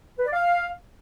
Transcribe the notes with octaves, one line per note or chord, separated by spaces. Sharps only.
B4
D5
F5